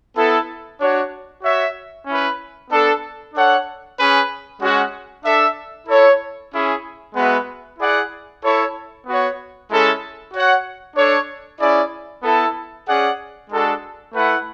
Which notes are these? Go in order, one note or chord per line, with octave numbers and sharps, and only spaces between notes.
B3 E4 A4
D4 F#4 C#5
F#4 C#5 E5
C#4 E4 B4
B3 D4 A4
D4 A4 C#5 F#5
C#4 G#4 B4
G#3 C#4 F#4
D4 A4 E5
E4 A4 C#5
C#4 E4 G#4
G#3 B3 F#4 B4 E5
E4 G#4 D5 F#5
E4 A4 C#5
B3 F#4 C#5
G#3 C#4 E4 A4 E5
F#4 C#5 F#5
D4 A4 C#5
C#4 E4 G#4 D5
B3 E4 A4
C#4 G#4 D5 F#5
G#3 D4 F#4 A4
A3 E4 B4 F#5